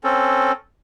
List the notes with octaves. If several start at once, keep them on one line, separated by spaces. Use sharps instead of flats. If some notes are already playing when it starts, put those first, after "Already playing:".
C4 C#4 A4